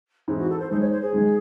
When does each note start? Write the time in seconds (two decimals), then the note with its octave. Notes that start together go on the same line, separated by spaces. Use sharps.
0.28 G#2 E3 C4 G#4
0.38 F#4
0.50 A4
0.59 C5
0.69 D#3 G#3 D#4 C5
0.80 C#5
0.91 C5
1.02 G#4
1.13 D#3 G#3 D#4